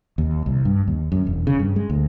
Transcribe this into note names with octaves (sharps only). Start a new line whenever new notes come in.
D#2
C2
G2
D#2
F#2
E1
C#3
G2
G#3
D2